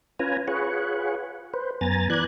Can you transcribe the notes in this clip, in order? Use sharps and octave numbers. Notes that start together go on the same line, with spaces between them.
C#4 F4 B4 G#5 A#5
F4 G#4 B4 C#5 F#5
B4 C5
F#2 B3 G#5 A#5 A6
E3 B4 D5 F#6 G#6